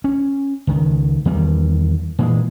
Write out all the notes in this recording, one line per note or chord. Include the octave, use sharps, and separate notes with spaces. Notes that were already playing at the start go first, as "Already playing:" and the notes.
C#4
C#2 D#3
E2 D#3 G3
A#2 E3 F#3 G#3